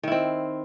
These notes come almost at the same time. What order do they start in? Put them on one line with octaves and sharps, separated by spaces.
D#3 E4 C4